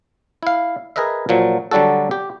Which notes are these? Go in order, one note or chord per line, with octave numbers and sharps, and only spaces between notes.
E4 F5
G#4 A#4 B4 D#5 E5
A#2 F3 F#3
D3 F#3 G3 D4 F#4 A4
G4